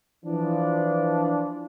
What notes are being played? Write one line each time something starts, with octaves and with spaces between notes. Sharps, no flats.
E3 F3 D4